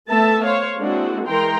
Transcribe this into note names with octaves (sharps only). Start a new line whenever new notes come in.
A3 B3 A4 E5 A5
C5 C#5 F5
G#3 A#3 C4 D4 E4 F#4
E3 G#3 A#4 G5 A#5 C6